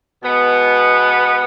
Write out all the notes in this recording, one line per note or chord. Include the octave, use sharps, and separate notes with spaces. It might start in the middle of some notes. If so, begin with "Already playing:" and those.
B2 G#3 B3